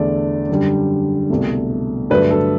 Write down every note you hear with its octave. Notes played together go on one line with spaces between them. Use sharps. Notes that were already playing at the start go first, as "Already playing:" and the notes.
Already playing: E2 D3 A3 D5
F#2 D3 G3
C2 B2 A3
G2 D3 F#3 A3 B4
A4